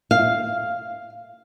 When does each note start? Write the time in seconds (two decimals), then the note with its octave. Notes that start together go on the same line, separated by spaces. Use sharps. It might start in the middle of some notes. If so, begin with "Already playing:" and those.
0.11 F5